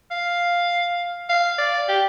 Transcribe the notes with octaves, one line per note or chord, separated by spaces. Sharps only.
F5
F5
D5
G4